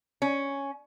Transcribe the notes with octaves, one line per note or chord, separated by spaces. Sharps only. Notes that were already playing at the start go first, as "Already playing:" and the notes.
C#4